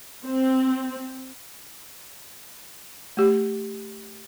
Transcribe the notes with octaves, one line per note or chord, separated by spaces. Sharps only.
C4
A3 G4